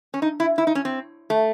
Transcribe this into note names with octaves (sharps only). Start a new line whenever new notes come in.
C#4
D#4
E4
E4
D#4
C#4
C4
A3